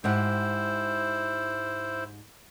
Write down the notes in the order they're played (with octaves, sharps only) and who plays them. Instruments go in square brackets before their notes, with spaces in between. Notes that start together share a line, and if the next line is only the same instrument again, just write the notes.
[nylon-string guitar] G#2 G4 F#5 [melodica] E4 C5